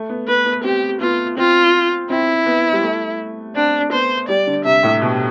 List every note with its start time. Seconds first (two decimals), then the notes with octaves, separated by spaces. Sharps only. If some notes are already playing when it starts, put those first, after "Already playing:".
Already playing: A3
0.09 B3
0.27 B3 B4
0.46 B3
0.64 C4 G4
1.01 B3 F4
1.37 C4 F4
2.10 C4 E4
2.46 B3
2.73 G3
2.82 A3
3.55 C4 D4
3.92 B3 C5
4.28 G3 D5
4.47 D3
4.65 C3 E5
4.83 A2
5.02 B2